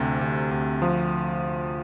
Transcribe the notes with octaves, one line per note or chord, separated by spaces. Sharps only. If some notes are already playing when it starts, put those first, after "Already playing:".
Already playing: D2 C3
D2
D2
F3